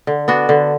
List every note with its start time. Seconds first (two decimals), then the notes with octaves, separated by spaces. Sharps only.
0.07 D3
0.28 B3 D4 F#4
0.49 D3